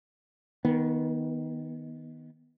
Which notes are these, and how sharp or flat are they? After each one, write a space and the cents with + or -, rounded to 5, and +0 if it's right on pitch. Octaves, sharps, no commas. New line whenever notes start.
D#3 +15 B3 -15